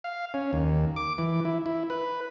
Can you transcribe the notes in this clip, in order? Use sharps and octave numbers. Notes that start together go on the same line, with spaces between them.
F5
C#4
D#2
D6
E3
E4
E4
B4